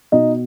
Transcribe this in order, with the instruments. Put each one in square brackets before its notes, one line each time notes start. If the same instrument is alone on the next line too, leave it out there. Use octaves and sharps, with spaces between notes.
[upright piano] B2 D#4 D#5